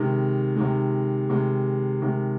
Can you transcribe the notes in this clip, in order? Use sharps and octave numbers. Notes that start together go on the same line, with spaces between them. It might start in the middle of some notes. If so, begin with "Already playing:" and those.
Already playing: C3 D#3 G#3
C3 D#3 G#3
C3 D#3 G#3
C3 D#3 G#3